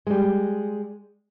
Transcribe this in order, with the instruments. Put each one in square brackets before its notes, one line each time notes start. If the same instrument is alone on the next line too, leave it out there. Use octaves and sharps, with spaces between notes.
[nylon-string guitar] G3 G#3